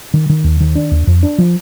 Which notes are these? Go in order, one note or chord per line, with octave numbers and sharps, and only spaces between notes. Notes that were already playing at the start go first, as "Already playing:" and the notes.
D#3
D#3
D#2
D#3
D4
D#2
F2
D4
F3